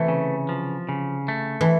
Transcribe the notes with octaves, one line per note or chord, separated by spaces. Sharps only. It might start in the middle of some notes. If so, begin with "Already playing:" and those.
Already playing: C3 E3 A3
C#3
F3
C#3
A3
E3